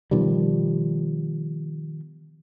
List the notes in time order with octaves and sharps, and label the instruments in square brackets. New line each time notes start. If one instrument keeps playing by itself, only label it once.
[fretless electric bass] B2 D#3 F3 G3